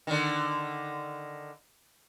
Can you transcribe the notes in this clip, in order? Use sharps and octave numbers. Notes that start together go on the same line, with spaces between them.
D3 D#3